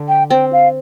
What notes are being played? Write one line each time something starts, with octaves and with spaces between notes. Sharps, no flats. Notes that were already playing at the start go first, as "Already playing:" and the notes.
Already playing: D3
G5
C4 G5
F5